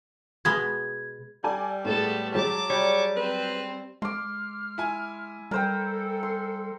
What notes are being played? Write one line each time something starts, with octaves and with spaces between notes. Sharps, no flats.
B2 G#3 B3 G#6
G3 A4 D5 G#5
A2 G#3 B3 A4
F#3 G#3 A5 D6
G3 C#5
C4 B4
G#3 C6 D6 F6
E4 G#5
G3 A4 A#4 C5 G5
C6